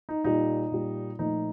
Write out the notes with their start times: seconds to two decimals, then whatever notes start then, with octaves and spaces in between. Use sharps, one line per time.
0.09 D#4
0.24 A#2 G3 D#4
0.72 A#2 G3
1.19 A#2 F3 A3 D#4